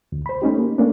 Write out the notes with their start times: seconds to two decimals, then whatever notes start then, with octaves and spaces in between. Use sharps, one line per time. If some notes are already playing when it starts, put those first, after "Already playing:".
0.12 D2
0.26 C5 B5
0.42 A3 C#4 D#4 G4
0.58 A#3
0.78 A3 A#3 C#4 D4